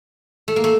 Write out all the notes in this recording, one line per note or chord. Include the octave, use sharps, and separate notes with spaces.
A3
A#3
A3